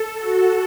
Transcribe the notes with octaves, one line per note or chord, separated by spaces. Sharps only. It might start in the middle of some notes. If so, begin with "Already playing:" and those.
Already playing: A4
F#4